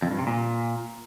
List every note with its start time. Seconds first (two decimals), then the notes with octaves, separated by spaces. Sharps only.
0.02 F2
0.11 G2
0.19 C3
0.27 A#2